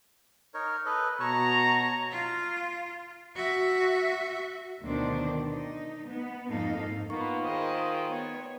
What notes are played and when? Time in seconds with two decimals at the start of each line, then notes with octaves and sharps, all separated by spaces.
0.54 D#4 A#4 C#5
0.86 A4 B4 D#5
1.20 B2 F#4 C#5 A5 A#5 C#6
2.11 F4
3.35 F#4 E5
4.83 D2 B2 D#3 D4 C5 D5
5.48 D#4
6.07 B3
6.50 F2 G#2 A#3 D#4 A4 F5
7.10 A#3 B3 D#4 F4 C#6
7.42 D#3 G#4 C5 D#5
8.08 B3 C#5